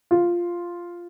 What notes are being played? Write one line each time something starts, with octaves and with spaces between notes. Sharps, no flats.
F4